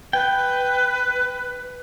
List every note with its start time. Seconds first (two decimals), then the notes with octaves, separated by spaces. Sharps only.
0.13 B4 G5